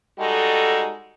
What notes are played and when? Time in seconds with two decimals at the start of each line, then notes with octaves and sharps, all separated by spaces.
0.19 G3 G#3 D#4 F#4 A4